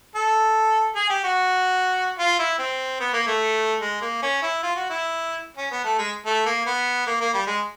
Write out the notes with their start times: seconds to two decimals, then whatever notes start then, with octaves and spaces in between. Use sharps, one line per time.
0.15 A4
0.96 G#4
1.10 G4
1.24 F#4
2.19 F4
2.39 E4
2.59 C4
3.00 B3
3.13 A#3
3.27 A3
3.81 G#3
4.02 A#3
4.22 C#4
4.43 E4
4.63 F4
4.76 F#4
4.90 E4
5.57 C#4
5.71 B3
5.85 A3
5.98 G#3
6.26 A3
6.46 A#3
6.66 B3
7.07 A#3
7.21 A#3
7.34 G3
7.47 G#3